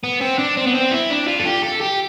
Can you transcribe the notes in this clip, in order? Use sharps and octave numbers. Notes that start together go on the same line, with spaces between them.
B3
C4
D4
C4
B3
C4
E4
D4
F4
A4
G4
A4
G4